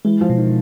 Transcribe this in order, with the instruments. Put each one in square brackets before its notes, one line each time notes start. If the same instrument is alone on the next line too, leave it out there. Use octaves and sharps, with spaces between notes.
[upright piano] E3 [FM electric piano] G#3
[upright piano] F3
[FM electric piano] B2
[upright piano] D#3